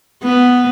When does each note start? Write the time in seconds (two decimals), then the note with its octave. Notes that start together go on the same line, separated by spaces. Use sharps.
0.23 B3